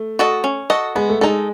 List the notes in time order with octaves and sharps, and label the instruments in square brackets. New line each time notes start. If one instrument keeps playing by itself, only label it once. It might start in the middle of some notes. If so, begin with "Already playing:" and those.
Already playing: [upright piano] A3
[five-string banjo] F#4 A4 D#5
C#4
F#4 A4 D#5
[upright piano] G#3 [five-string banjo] B3
[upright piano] A3
[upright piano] G#3 [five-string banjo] D#4 A4